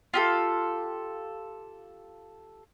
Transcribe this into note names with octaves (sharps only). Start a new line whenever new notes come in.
F4 G4 A4